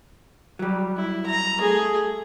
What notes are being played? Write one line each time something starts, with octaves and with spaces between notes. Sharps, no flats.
F#3 G3
E4
A#5
A3 G#4